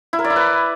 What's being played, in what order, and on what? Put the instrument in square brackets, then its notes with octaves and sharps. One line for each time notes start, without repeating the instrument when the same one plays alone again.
[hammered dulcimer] E4
A#4
D5
E4
B4